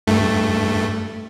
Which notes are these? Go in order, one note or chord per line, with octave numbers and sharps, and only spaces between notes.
G2 A3